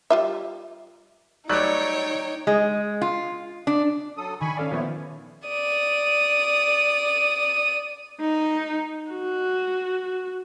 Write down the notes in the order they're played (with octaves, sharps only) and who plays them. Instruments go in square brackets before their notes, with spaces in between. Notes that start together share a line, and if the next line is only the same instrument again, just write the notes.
[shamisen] G3 F4 E5
[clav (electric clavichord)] F#3 G3 A3 [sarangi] D#4 [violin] C#5 G5 [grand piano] D5 F#6
[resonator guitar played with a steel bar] G#3
F4
D4
[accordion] F#3 A4 D#6
[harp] D#3 [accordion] G#5 B5 C#6
[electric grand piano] C#4 A4 D5 [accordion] F5
[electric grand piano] A#2 F3 B3 [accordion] E4 C#5
[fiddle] D5 D#6
[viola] D#4
F#4